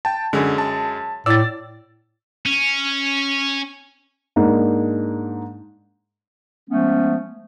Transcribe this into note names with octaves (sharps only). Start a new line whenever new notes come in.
G5 A5
F#2 D3 G#3
A5
A2 D5 E6 A6
C#4
G#2 A#3 D4 D#4
F3 G#3 A3 B3 C#4